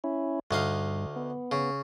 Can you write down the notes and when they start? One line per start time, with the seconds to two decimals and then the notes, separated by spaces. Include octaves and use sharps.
0.04 C#4 E4
0.51 D2 G2 D#4 F5
1.16 B3
1.51 C#3